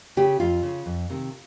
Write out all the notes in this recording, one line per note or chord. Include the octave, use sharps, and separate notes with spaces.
C#3 G4
F2 F4
C#3
F2
C3 D#3